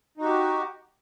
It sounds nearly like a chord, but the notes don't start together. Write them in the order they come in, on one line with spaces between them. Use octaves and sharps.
D#4 F#4 G4